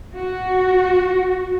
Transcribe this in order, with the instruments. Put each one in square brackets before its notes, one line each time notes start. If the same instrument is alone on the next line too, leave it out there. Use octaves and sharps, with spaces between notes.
[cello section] F#4